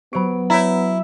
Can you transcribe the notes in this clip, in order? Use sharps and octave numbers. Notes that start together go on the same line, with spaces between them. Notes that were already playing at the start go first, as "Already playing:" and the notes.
F#3 B3 G4 C5 B5 D7
E4 C#5 E5 A#5